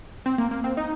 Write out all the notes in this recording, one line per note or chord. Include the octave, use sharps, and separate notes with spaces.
C4
A#3
A#3
C4
D#4